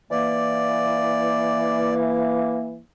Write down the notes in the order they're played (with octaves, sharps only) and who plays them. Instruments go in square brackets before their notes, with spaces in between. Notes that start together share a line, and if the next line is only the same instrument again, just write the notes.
[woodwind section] E3 A#3 [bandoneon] D5